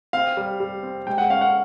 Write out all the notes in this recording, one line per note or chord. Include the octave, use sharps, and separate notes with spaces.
C4 F5
G3
G3
C4
G#3 G5
F#5
C#4 F5
F#5